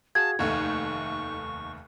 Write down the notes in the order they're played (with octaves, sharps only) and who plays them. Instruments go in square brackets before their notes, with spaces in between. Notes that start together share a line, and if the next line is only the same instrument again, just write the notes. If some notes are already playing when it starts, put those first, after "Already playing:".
[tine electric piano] F#4 G#4 F5 [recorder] A5 [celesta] G#6
[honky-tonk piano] F1 D#2 A3 [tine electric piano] D#4 [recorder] C#6